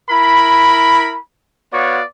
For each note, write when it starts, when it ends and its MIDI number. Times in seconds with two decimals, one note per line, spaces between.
0.10 1.18 64
0.10 1.18 70
0.10 1.18 83
1.73 2.01 59
1.73 2.01 66
1.73 2.01 73
1.73 2.01 74
1.73 2.01 77